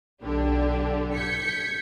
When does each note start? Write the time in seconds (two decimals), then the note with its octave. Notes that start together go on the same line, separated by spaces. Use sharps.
0.22 B1 D3 D4 G4
1.14 G6 G#6 B6 C#7